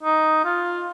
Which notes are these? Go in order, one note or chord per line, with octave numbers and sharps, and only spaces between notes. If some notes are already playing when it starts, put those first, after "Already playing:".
D#4
F4